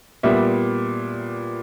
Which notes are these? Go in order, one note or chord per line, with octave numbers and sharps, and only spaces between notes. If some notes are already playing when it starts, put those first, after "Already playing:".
A#2 G3 B3 E5